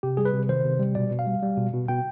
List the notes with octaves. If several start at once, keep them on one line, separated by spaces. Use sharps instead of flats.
C3 G4
G3 G#4
B4
C3
D#3 C5
C3
G3
B2 D5
B2
F5
G3
G3
B2
B2
B2 G5